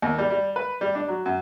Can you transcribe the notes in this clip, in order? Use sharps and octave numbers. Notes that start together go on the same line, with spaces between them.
D#2
G3
G3
B4
G3
D4
F#3
F#2